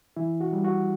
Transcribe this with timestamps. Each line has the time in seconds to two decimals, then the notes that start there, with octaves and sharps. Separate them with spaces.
0.17 E3 E4
0.41 F#4
0.53 G3
0.65 F#4